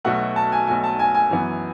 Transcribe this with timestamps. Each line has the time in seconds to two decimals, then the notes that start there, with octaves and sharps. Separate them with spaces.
0.04 B1 B2 A3 F#5
0.36 A5
0.52 G#5
0.67 B1 B2 A3 G#5
0.84 A5
0.99 G#5
1.15 G#5
1.31 F#2 E3 B3